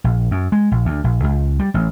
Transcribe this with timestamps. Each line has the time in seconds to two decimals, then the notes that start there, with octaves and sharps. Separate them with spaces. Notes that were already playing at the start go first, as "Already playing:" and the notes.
0.04 A#1
0.31 F#2
0.52 G#3
0.72 A#1
0.85 D2
1.04 A#1
1.24 C#2
1.59 G3
1.74 A1